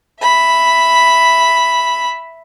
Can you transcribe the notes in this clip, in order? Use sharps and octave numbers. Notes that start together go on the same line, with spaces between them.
E5 B5